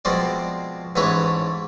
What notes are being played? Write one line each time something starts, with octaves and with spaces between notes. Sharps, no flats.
B2 F3 G#3 C4 D5
A1 G#2 E3 A3 B4 C#5